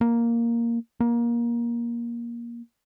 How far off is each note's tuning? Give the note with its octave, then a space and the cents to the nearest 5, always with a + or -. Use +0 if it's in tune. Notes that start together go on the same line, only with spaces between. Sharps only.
A#3 +0
A#3 +20